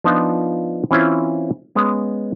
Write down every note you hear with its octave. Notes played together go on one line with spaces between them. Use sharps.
F3 B3 D4 D#4 F4
E3 C4 C#4 E4 F4 C5
G#3 B3 C#4